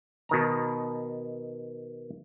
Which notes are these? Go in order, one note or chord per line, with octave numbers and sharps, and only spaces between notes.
B2 D#3 A#5